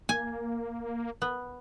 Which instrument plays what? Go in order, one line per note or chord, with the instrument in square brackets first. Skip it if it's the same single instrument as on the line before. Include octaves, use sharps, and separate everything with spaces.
[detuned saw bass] A#3 [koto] G#5
[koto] B3